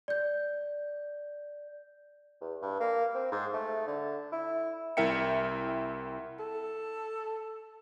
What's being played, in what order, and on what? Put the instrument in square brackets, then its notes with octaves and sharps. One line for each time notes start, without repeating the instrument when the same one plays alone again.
[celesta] D5 G6
[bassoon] E2
G2
A#3
C4
G#2
A3
D3
E4
[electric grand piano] C2 E4 A#4 E5 G5 C#7
[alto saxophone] A4